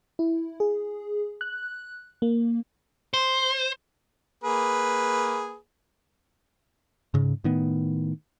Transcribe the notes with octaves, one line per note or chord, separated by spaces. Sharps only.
E4
G#4
F#6
A#3
C5
A#3 G#4 B4
G#2 C#3
A2 D#3 B3